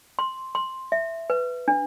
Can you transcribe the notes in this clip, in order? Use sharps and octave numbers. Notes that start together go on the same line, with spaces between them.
C6
C6
E5
B4
D4